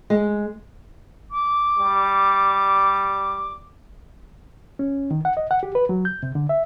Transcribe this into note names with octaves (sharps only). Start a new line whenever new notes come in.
G#3
D6
G3
C#4
D#3
F#5
D#5
F#5
G4
B4
F#3
G6
C3
D3
E5